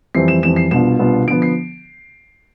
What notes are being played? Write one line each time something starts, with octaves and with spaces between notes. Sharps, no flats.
F2 E3 G3 C4 C7
E7
F2 E3 G3 C4 E7
C7
C2 B2 B3 D4 F4 E7
C2 B2 B3 D4 F4
D3 F3 B3 D7
C7